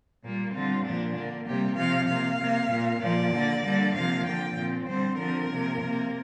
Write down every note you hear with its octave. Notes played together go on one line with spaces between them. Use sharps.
A#2 G3 A#3
D3 G3 C4 F4
A#2 F3 A#3 D4
D3 A#3
C3 G3 A#3 G4
C3 F3 C4 F5
C3 A#3 F5
C3 A#3
A#2 A#3
A#2 F3 A#3 D5
D3 A#3
D3 G3 A#3
C3 F3 A#3 F5
D3 F3 A#3 G5
A#2 F3 C4
D3 G3 C4 C5
D3 F3 C4 A#4
C3 F3 A#3
C3 A#3